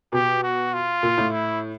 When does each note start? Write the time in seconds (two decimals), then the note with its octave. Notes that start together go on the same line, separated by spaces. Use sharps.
0.13 B2 G4
0.43 F#4
0.73 F4
1.03 A#2
1.18 A2
1.33 E4